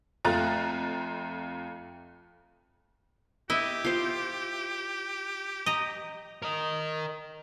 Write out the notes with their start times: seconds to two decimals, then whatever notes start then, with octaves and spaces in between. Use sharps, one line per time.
0.25 F2 A3 F4 A#5 F#6 A6
3.50 E4 G4 D#5 E5
3.85 F4 C5
5.66 D#5 A#5
6.42 A#4 D#5